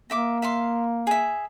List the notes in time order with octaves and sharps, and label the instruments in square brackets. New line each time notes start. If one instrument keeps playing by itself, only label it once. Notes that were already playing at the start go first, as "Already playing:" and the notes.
[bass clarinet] A#3 [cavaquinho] D#5 E5 D6
[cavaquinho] E5 F5 C6
G#4 E5